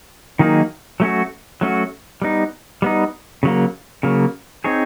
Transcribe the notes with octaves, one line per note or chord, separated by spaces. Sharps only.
D#3 F#3 A#3 D#4 G#4
F#3 A3 C#4 F#4
F#3 A3 C#4 F#4
G3 B3 D#4
G3 B3 D#4
C#3 F#3 A#3
C#3 F#3 A#3
C4 D#4 G#4 C#5